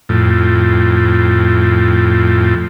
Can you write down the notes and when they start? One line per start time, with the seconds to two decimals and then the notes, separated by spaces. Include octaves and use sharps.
0.09 F2 A2